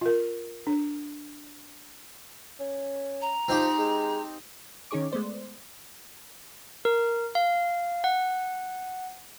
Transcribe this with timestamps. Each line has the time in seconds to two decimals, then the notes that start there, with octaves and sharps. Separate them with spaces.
0.01 F4 A#4
0.67 D4
2.60 C#4
3.22 A#5
3.48 F3 C4 D#4 G4
3.78 G#3
4.91 D#3 C#4 D#4 G#4 C#5 D6
5.11 G#3 A3 B3 C5 D5
6.85 A#4
7.35 F5
8.04 F#5